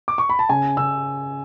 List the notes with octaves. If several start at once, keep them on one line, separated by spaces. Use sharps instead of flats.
D6
C#6
B5
A5
C#3 G#5
C#3 E6